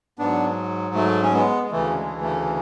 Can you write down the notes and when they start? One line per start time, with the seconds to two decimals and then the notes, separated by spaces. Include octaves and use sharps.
0.19 G#2 F#3 B3 D4
0.95 A3
1.23 C#4
1.33 G#3 B3
1.62 G#3
1.70 D2 C#3 E3 A3
1.96 G#3
2.22 A3